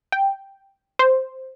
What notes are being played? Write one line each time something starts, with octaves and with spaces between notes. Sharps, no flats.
G5
C5